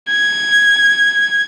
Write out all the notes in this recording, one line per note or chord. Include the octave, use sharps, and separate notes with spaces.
G#6